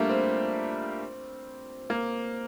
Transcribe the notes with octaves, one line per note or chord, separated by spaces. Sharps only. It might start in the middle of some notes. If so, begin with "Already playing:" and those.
Already playing: G3 A3 A#3 D4 F4
C4
A#3